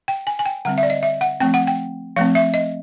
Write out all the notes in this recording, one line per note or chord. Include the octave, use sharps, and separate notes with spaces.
G5
G#5
G#5
G5
D3 G3 C4 F#5
E5
D5
D#5
E5
F#5
F3 A3 C4 G5
F#5
G5
F3 A3 C4 F5
E5
D#5